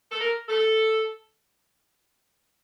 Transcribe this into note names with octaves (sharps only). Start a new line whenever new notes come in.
A4
A#4
A4